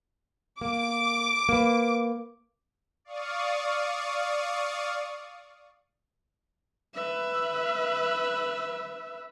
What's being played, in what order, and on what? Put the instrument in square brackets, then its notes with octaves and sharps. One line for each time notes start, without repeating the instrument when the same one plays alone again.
[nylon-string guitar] A#3 [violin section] D6
[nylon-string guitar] A#3 B4
[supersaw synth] D5 F5 C#6 D#6
[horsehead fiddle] B4 E5